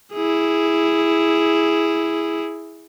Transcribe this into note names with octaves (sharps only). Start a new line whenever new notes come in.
E4 G#4